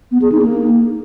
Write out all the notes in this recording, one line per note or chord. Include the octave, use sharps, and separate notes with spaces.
B3
G#4
D#4
A#3